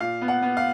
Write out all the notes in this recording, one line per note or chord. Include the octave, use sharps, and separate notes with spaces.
A#2 F5
B3
F#5
B3
F5